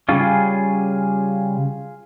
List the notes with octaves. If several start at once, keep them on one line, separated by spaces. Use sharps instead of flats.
C#3 G3 C#4 F4 G#4